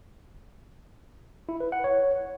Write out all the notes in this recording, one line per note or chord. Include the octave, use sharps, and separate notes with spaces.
E4
B4
F#5
C#5